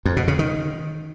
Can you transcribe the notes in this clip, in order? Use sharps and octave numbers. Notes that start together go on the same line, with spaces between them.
F2
B2
C#3
D#3